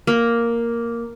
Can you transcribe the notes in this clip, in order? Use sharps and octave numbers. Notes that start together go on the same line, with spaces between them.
A#3